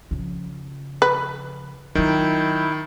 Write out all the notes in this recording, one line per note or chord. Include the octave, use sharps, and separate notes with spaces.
C#3 F3
B4
D#3 F#3 E4 F4 G5